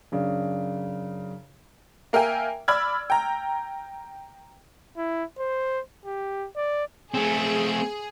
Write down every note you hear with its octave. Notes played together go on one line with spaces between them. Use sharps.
F#2 C#3 D4
A#3 A#4 E5 G5 G#5
D5 B5 E6 F6 G#6
G5 A#5
E4
C5
G4
D5
A3 C4 G#4